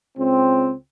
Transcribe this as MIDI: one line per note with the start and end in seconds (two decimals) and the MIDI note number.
0.18 0.73 37
0.18 0.73 60